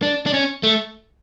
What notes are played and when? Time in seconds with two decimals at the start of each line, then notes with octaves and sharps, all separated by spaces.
0.02 D4
0.26 D4
0.34 C#4
0.63 A3